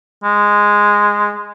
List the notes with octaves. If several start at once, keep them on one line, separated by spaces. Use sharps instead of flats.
G#3